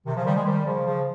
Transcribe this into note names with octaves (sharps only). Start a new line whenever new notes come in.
C3 D#3
C#3 F3
D#3 G3
F3 G#3
D#3 G3
C#3 F3
C#3 F3